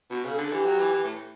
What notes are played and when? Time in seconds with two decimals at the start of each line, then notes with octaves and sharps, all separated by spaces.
0.10 B2 F#4
0.25 C#3
0.31 A4
0.38 D3
0.52 E3 G4
0.65 F#3
0.79 E3
0.94 E3
1.04 A2